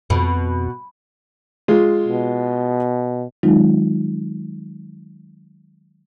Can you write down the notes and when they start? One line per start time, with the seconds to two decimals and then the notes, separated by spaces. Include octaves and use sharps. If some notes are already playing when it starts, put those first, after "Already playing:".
0.10 F2 B2
1.68 G#3 F4
2.08 B2
3.43 D#3 F#3 G#3 C4 D#4 F4